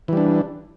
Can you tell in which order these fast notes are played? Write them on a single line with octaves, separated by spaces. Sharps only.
E3 G3 D4